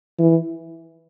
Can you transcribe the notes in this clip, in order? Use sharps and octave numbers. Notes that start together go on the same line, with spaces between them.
E3